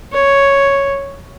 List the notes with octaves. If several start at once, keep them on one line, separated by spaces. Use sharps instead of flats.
C#5